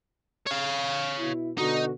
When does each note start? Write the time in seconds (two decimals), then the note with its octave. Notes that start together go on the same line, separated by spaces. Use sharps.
0.47 C#5 F5
1.20 B2 E4
1.58 B2 D3 D#4 F#4